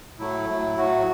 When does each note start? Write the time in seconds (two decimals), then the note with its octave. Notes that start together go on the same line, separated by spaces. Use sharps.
0.19 A2 F#3 A3 E4
0.48 A2 F#3 A3
0.77 A2 F#3 A3 F#4